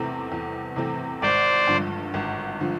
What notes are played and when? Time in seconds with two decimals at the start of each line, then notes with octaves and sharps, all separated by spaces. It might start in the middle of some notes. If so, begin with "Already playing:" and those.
Already playing: E2 C3 E3 A3 C4
0.32 E2
0.76 C3 E3 A3 C4
1.22 G#1 C5 D5
1.67 G2 D3 F3
2.14 G#1
2.60 D3 F3